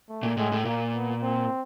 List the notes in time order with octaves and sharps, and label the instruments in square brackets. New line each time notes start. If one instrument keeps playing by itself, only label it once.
[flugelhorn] A3
[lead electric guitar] A#2
[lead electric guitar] A2 [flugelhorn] G#3
[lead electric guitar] A2
[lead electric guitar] A#2 [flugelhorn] A#3
[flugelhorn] B3
C4